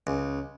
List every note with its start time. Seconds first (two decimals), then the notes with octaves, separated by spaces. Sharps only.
0.07 C#2